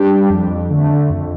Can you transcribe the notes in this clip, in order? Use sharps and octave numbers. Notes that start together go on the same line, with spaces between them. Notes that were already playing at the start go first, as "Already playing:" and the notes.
Already playing: G3 D4 G4
F2
D3 A3
F2